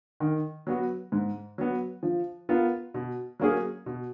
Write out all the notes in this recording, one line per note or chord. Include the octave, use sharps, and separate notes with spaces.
D#3
F#3 B3 F#4
G#2
F#3 B3
F3
B3 F4 A#4
B2
F#3 A#3 C#4 G#4
B2